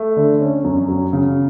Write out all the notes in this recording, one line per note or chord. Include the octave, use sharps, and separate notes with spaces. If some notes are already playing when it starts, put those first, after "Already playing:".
Already playing: A3
D3
C#4
F#2
F#3
C#3